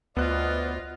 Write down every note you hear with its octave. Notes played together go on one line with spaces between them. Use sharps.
D2 B3 F4 C5 D5 D#5 F#6